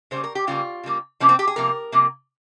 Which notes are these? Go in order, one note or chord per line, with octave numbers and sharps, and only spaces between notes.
C#3 G3 A#3 C5
A#4
G4
C#3 G3 A#3 F4
C#3 G3 A#3
C3 F3 A#3 C#4
C4
G4
G#4
C3 F3 A#3 A#4
C3 F3 A#3